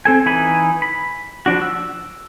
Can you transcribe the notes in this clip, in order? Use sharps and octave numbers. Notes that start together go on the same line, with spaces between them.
C4 A4 G#5
E3 D#4 G#5 B5
B5
F3 D4 F#4
E6